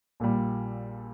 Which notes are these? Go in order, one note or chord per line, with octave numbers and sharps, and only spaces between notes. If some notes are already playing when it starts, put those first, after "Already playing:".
A#1 A#2 G3